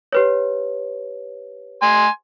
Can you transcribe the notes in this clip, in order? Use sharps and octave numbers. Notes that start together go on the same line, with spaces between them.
G4 B4 C#5
G#5 C6